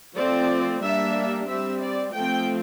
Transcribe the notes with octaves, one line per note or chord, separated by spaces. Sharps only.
F3 A3 C4 D5
G3 A#3 D4 E5
G3 C4 E5
D5
F3 A3 C4 G5